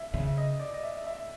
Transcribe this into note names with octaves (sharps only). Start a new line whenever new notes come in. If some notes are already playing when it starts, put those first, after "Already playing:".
Already playing: E5
C#3 E5
D#5
D5
D#5
E5
E5